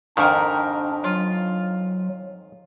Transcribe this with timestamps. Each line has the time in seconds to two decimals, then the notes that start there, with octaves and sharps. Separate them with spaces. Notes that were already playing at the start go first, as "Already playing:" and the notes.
0.17 F2 G#2 D#3 D4 G4 A#4
1.04 F#3 F4